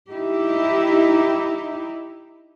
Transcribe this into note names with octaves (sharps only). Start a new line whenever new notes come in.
D#4 E4 G4